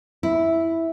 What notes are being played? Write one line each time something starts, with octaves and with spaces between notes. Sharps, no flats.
E4